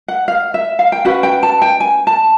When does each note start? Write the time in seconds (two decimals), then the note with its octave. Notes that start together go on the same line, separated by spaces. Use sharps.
0.08 F#5
0.28 F5
0.54 E5
0.79 F5
0.92 G5
1.05 C#4 F#4 B4 F#5
1.23 G5
1.43 A5
1.62 G5
1.80 G#5
2.07 A5